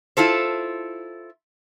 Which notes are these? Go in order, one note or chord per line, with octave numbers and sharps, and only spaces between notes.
E4 F4 A4 C5